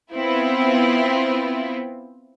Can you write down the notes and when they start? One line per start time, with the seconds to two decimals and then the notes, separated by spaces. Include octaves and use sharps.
0.12 B3 C4 E4 F4